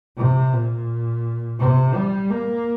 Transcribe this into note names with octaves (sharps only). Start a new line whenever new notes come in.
C3
A#2
C3
G3
A#3